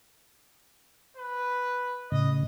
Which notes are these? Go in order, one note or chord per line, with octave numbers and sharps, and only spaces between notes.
B4
A2 C#3 D#5